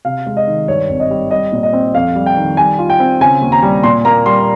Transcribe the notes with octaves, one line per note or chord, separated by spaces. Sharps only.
C3 F5
G#3
D#5
D#3
G2 C#5
G#1
D#5
G3
G3 D#5
A#2
D#5
C4
F2 F5
G3
G5
D#3
G3 G#5
F4
G5
C4
C#3 G#5
D#2
A#5
G3
A#2 C6
A#3 A#5
G3 C6